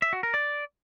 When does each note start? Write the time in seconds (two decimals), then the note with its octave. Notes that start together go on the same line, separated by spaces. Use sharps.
0.02 E5
0.13 F#4
0.23 A#4
0.34 D5